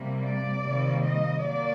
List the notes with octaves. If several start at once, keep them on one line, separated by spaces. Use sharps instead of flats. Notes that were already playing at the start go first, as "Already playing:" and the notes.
Already playing: C3 G3 A#3
D5
C3 D#3 G3 A#3
D#5
F#3 A#3 D5